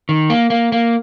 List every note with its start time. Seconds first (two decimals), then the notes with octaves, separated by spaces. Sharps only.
0.09 D#3
0.30 A#3
0.50 A#3
0.72 A#3